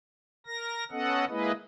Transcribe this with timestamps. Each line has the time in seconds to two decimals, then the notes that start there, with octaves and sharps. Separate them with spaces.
0.46 A#4 A#6
0.91 B3 C#4 A4 D#5 F#5
1.29 G#3 A#3 E4 G#4 B4 D#5